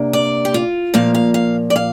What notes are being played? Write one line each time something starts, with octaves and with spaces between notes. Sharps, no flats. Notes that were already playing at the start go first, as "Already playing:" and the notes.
Already playing: C3 A#3 D4
D5
G4
F4
A#2 F3 A#3 F5
F5
F5
D5
F5